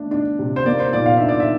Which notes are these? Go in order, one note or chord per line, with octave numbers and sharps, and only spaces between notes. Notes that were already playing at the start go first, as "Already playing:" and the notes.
Already playing: A3 D4
D4
C3
C5
A#3 D5
C5
A#2 D5
F5
D4 E5
D5
E5